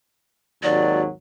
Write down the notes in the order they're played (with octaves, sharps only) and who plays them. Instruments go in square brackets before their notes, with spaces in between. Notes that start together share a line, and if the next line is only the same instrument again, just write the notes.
[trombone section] G#1 D#2 F#3 [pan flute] D5